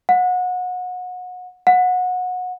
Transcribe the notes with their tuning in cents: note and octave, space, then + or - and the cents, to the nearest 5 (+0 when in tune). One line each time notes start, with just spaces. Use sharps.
F#5 -30
F#5 -25